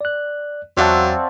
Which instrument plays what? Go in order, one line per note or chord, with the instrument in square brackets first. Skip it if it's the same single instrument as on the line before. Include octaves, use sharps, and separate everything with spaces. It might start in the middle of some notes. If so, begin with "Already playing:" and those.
[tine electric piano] D5 F#6
[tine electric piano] E2 [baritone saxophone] F#3 [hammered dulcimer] C4 F4 F#4 [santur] D5 E5 A5